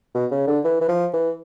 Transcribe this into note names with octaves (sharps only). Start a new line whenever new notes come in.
B2
C#3
D3
E3
E3
F3
E3